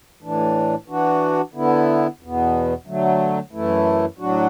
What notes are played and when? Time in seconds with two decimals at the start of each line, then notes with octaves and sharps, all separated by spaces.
0.22 A2 E3 D4
0.88 E3 D4 F#4
1.54 D3 B3 E4
2.21 E2 B2 B3
2.86 D3 F#3 A3
3.53 F#2 E3 A3 E4
4.19 A2 F#3 D4 F#4